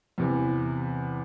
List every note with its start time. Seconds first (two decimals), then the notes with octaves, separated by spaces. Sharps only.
0.18 E2 C3 E3